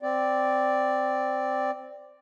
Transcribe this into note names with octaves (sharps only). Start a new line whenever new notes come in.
C4 D5